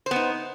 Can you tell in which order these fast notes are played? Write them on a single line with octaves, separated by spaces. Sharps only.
C5 B3 D#4